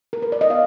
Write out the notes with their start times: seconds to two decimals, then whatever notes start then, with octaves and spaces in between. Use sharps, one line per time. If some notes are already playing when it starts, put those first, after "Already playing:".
0.13 A#4
0.22 B4
0.32 D5
0.41 D#5
0.50 B3 F5